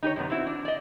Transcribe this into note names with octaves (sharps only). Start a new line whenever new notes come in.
D#4 G4 B4 C#5
F#2 C3 A3 B3
C4 E4 F#4
D4
D5 D#5